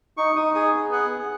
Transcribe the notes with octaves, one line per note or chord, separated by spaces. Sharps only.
D#4 C#6
D#4 D#6
G#4 D#6
B3
G#4 F#5
G#4